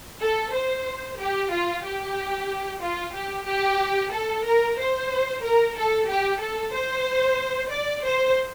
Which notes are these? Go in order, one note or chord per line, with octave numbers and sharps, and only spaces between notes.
A4
C5
G4
F4
G4
F4
G4
G4
A4
A#4
C5
A#4
A4
G4
A4
C5
D5
C5